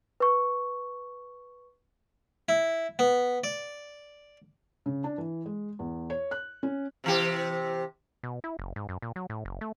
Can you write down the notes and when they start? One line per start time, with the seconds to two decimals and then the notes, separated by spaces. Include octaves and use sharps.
0.20 B4 C#6
2.49 E4
2.99 B3
3.44 D5
4.86 C#3
5.04 D4
5.18 E3
5.46 G#3
5.79 E2
6.10 C#5
6.31 F#6
6.63 C#4
7.04 C3 E3 G4
8.23 B2
8.44 E4
8.59 F#1
8.76 G#2
8.89 F#2
9.02 A#2
9.16 F#3
9.30 A2
9.45 F#1
9.61 A3